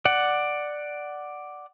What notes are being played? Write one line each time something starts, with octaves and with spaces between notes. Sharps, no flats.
D5 F#5